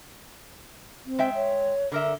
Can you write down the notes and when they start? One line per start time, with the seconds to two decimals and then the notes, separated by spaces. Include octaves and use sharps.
1.06 C4
1.19 G#3 E5 G5
1.35 C#5
1.92 D3 A#4 E5